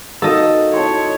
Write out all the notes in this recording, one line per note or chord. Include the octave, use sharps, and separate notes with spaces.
A#3 D#4 F#4 A4 D#5
E4 C#5 A5 C6